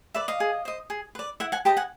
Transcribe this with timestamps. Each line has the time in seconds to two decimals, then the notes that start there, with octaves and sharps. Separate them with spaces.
0.15 B4 D5 E5
0.28 D#5 F5
0.40 G#4
0.65 C5 D#5
0.90 G#4
1.15 B4 D5
1.40 E4 E5 F#5
1.52 F#5 G#5
1.65 G4 B4 D#5 G5 A5
1.77 F#5 G#5